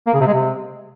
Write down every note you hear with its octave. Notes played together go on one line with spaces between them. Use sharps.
A#3
C#3
C3
G#3
C3